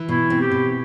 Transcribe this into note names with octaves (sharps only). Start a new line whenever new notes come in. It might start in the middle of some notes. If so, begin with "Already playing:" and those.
Already playing: E3
B2 E4
C4
G4
B2